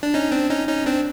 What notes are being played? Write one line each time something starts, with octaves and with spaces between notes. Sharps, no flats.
D4
C#4 D#4
C4 D4
C#4 D#4
C#4 D#4
C4 D4